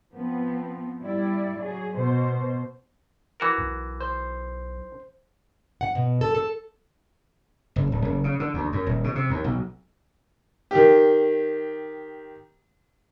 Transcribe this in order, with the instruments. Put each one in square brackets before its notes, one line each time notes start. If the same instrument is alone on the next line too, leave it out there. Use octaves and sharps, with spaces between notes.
[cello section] F3 B3 C4
G3 E4 D5
F#3 G#4
B2 C5
[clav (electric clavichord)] E3 F#4 A#4
[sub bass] B1
[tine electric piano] C5
[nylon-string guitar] F#5
B2
A4
A4
[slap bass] F#1
D1
F#1
C#3
D3
D2
F#2
D#1
B2
C3
D#2
B1
[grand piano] D#3 G4